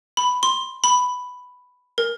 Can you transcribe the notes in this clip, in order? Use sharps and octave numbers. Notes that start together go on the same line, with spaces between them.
B5
C6
B5
A#4